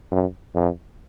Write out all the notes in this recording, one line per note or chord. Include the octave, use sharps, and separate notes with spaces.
F#2
F2